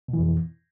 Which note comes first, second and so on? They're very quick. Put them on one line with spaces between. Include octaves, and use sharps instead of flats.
B2 E3 F2